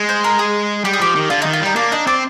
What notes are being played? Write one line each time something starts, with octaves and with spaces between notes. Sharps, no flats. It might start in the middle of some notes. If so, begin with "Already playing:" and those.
Already playing: G#3
C5
A#4
G#4
G3 G4
G#4
F3 G4
D#3
D3 F4
D#3 D#4
F4
G3 D#4
A#3 D4
D4 D#4
C4 D4